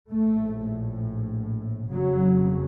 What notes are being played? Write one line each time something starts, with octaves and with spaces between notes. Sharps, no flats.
A#1 A2 A3
F#1 F2 C#3 F#3